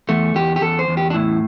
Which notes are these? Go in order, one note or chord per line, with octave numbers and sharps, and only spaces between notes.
E2 A3
E2 G4
G4
E2 A4
C5
E2
G4
D4
A2 E4